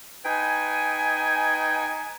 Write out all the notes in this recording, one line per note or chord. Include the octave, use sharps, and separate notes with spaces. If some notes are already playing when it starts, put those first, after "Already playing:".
D#4 B4 G5 G#5